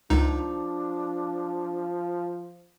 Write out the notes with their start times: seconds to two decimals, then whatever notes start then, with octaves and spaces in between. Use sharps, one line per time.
0.10 C#2 F3 D4 D#4